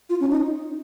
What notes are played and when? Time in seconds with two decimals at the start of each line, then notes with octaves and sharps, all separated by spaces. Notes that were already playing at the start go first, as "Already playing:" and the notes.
0.10 F4
0.20 C#4
0.31 D#4